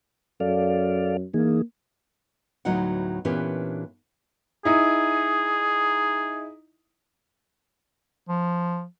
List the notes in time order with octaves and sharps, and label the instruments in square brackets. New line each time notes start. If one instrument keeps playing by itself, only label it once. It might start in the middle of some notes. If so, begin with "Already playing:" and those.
[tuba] F#2 [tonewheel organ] A4 D5 F5
[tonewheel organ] E3 D#4 G#4 [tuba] A#3
[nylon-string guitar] D2 A2 F#3 B3 D#4 F#5
A#2 E3 B3 C#4 D4 G4
[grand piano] D#4 E4 [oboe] G#4
[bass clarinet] F3